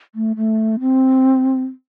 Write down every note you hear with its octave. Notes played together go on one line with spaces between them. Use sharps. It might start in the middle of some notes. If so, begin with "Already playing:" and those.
A3
A3
C4